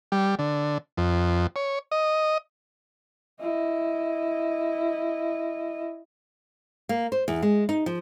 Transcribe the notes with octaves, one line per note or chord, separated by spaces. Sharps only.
G3
D3
F2
C#5
D#5
E4 D#5
A#3
C5
E2
G#3
D#4
F3